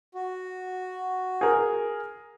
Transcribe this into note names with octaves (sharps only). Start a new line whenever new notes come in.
F#4
G#4 A#4